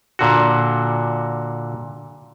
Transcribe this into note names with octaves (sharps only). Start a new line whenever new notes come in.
A#2 D3 F#4